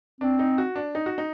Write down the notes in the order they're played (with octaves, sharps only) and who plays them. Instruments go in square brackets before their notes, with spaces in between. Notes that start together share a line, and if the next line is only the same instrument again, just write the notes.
[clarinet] C4 [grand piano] D4
[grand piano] D#4
F#4
D4
D#4
F#4
D#4